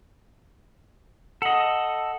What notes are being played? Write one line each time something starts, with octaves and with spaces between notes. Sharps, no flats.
A4 D#5 F#5 C#7 F#7